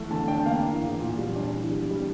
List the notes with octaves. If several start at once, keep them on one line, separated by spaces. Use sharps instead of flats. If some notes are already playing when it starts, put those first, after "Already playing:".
Already playing: E2 A3
D3 A5
D4 G5
A#3 F5
E3
E2
A#2
G3
D4
E3
G3
G3